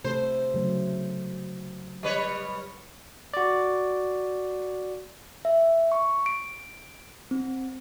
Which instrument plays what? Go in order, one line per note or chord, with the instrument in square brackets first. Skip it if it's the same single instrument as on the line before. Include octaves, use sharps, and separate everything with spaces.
[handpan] C3 A3 A4 [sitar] C5
[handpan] C#3 F#3 A3
[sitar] G3 B4 C#5
[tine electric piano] F#4 D5
[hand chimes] E5
C#6
D7
C4